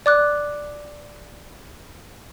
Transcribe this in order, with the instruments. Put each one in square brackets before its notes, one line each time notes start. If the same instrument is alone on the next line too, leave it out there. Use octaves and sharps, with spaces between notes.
[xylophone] D5 D6 F#6